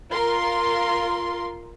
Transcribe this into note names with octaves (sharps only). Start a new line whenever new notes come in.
F4 A#4 C6